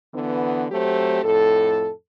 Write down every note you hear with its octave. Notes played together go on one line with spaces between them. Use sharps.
D3 E3 B3
F#3 A3 C4 G4 C5
F2 A2 A4